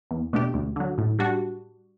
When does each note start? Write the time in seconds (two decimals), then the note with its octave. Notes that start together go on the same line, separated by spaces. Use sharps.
0.11 E2
0.33 B2 A3 D4 G4
0.54 D2
0.76 D3 F#3
0.98 A2
1.19 G3 D4 F#4